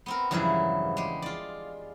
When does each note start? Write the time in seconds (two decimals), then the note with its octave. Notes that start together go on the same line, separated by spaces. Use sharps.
0.06 B3 C4 A#4
0.31 E2 G2 C#3 F3 F#3 E4
0.97 G#3 G4
1.22 F4 D5